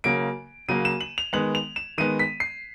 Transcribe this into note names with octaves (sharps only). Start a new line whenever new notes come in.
C#3 F#3 A#3 D7
C#3 F#3 A#3 D#7
E7
F#7
F7
D#3 G#3 B3 F#7
F7
E7
D#3 G#3 B3 D#7
B6
C7